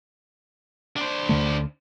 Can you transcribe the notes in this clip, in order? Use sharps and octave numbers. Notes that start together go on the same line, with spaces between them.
D4 C5
D2 D3 A3